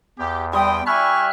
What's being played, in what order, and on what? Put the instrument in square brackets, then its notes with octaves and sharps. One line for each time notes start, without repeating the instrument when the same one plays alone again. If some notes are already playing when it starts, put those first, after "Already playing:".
[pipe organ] E2 [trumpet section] G4
[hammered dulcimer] G3 [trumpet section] C4 C6 D#6 [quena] G5
[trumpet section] E4 D5 G#5 [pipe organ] E5 F6 F#6 [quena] C#6